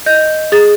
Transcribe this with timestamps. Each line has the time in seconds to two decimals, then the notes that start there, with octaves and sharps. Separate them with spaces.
0.06 D#5 G6
0.52 G#4 A6